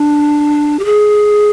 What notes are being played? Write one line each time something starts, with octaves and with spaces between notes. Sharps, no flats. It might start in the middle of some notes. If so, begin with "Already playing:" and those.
Already playing: D4
G4
G#4